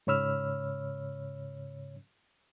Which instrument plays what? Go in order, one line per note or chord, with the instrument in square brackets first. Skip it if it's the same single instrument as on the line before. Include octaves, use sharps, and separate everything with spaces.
[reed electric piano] G#2 C#3 C#5 B5 E6 F6